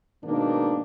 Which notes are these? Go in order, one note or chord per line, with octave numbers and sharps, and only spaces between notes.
G#2 B2 D#3 A#3 D4 D#4